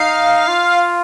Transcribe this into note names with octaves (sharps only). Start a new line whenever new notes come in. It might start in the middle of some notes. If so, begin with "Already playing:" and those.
Already playing: D#4 F5
F4